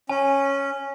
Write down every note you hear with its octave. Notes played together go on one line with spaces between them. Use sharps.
C#4 G#5